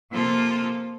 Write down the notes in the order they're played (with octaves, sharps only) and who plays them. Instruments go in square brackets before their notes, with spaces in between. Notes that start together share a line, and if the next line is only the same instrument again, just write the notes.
[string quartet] C3 F3 A#3 F4 A4